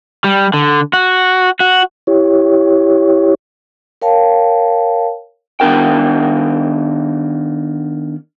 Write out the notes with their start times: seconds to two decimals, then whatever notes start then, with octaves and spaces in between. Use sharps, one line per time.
0.24 G3
0.54 D3
0.93 F#4
1.60 F#4
2.07 E4 G4 C#5
4.02 A#4 C#5 F5 G5 A5
5.60 D#3 B3 D4 A#4 G5